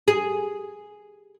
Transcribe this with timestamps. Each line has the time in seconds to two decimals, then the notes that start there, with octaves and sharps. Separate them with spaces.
0.08 G#4